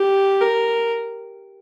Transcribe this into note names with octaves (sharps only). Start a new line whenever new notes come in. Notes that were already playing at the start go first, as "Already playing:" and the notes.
Already playing: G4
A#4